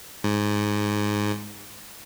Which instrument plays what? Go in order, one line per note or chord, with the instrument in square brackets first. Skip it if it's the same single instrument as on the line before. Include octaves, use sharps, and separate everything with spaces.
[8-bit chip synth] G#2